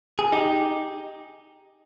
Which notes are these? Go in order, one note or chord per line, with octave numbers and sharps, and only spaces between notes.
G#4
D#4 G4